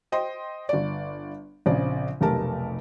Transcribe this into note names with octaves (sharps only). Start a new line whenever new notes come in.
C5 D#5 G5 C6
G1 D5
A#1 C#3 C4 D5
F1 B1 A3 G4 A#4 A5